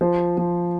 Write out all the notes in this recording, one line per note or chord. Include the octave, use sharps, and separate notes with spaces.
F3 C5
F3